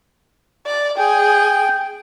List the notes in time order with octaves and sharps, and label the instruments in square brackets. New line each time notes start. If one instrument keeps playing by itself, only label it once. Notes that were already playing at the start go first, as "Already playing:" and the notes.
[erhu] D5
[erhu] G#4 [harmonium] G5